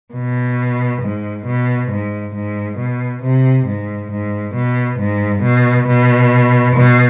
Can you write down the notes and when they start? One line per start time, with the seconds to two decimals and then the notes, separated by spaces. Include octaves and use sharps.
0.14 B2
1.02 G#2
1.46 B2
1.91 G#2
2.35 G#2
2.79 B2
3.23 C3
3.67 G#2
4.12 G#2
4.55 B2
4.99 G#2
5.43 B2
5.88 B2
6.76 B2